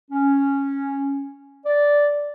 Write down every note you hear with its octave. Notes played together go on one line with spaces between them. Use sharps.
C#4
D5